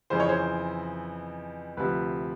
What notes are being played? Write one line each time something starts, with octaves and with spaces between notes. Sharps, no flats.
F2 C#3 E3 C5
C#5
C5
D2 C3 F3 B4